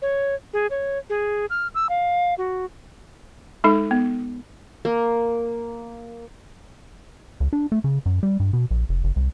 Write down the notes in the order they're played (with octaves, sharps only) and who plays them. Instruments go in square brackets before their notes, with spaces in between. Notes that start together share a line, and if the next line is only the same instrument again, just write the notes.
[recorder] C#5
G#4
C#5
G#4
F6
E6
F5
F#4
[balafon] G#3 D#4 A4
B3
[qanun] A#3
[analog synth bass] C#2
D4
A3
C#3
F#2
G3
G2
B2
A#1
F1
F#1
C2